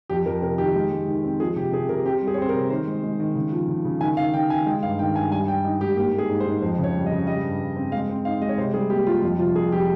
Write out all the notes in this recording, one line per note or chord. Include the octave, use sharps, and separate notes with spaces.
F2 G4
F2 A#4
C3 A#4
D#3 G4
G#3
G#3
D#3
C4
F3 G#4
C3 G4
C3 G#4
C3 A#4
C4 G4
G3
G#4
C#5
C4 C5
A#4
C3
D#3 C5
G#3
G#3
D#3
C#3
F3
C#3
C#3
D#3 G#5
D#3 F5
D#3 G5
D#3 G#5
G#3 G5
G2 F5
D#3 G5
G2 G#5
G3 G#5
G3 G5
D#4
G#2 G4
A#3 G4
A#3
G#4
G#2
C5
G#2
F2 C5
C#3
C#5
G3
D#5
C#3
G3 D#5
G2
G2
C4
G#3 F5
C4
D#4 F5
G#3 D#5
C#5
C3 C5
G3 G#4
A#3 G4
G3 F4
F2 F4
C3 F4
F2 G#4
F3 G4